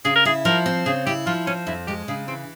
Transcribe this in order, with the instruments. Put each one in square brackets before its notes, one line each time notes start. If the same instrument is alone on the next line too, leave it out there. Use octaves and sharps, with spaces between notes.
[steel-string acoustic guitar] C#3 [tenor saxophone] G#4
[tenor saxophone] A#4
[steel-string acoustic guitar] E4 [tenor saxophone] G#4
[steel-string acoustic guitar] F3 [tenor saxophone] A#4
[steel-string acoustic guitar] C4
[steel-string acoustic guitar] C#3 [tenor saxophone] G#4
[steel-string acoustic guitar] E4 [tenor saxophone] G4
[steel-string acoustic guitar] F3 [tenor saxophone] F4
[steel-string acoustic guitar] C4 [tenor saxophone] C#4
[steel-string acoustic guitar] F2 [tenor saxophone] E4
[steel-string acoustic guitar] G#3 [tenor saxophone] G4
[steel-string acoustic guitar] C#3 [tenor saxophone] G#4
[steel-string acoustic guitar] E3 [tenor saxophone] C4